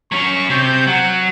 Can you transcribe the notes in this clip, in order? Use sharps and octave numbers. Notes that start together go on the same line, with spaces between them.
F#3 C#4 C#6
C3 G6
F#3 F#5